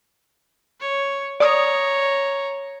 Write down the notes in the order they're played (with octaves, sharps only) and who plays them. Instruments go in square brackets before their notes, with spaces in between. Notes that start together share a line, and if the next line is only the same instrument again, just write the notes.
[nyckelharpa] C#5
[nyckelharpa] C#5 A#5 [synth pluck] D5 D#6